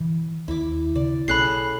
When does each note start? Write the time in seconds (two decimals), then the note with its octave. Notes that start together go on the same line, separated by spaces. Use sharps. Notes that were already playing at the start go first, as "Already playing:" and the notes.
0.01 E3
0.48 D#2 E4 D6
0.95 C#3 C4 D5
1.28 B1 A3 C#4 G#4 B5 F#6 C7